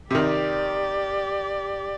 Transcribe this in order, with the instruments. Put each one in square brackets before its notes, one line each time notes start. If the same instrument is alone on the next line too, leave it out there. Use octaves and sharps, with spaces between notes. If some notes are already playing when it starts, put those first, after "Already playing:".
[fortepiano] C3 D#3 [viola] G4 D5